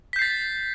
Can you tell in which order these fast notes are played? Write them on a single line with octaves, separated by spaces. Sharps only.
B6 G6 C7 A6